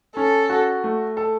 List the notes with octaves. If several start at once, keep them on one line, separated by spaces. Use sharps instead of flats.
C#4 A4
F#4
A3
A4